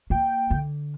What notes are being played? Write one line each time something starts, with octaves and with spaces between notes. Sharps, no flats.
A#3 G5
D3